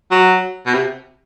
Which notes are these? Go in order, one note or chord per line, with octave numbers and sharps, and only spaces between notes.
F#3
B2
C3